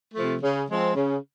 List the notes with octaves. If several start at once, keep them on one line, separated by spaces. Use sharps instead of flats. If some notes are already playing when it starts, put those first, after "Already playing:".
C3 F3 A3
C#3
F3 G#3 C4
C#3